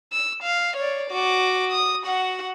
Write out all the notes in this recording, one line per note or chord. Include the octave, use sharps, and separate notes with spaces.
E6
F5
C#5 D5
F#4 D6
D#6
F#4 F#5